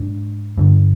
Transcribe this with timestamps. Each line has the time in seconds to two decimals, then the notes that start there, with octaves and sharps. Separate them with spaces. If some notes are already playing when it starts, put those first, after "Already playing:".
Already playing: G#2 D4
0.58 G2 D3